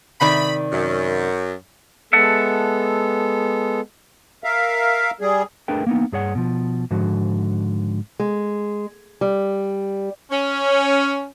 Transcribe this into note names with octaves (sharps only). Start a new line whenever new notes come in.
C3 D#3 D5 B5
F#2
G#3 B3 A4 E5 F#5 A5
A#4 E5 F5
G3 G#4
A3 D4 G#4 A#4 B4 G5
A#3 B3 D#4
G2 G#4 C#5 F#5
B2 F3
G#2 D3 F3 F#4
G#3
G3
C#4